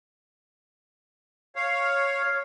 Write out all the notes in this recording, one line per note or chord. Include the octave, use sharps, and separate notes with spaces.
C#5 F5